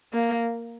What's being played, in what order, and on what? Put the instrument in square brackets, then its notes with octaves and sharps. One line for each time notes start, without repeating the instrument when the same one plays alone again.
[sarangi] A#3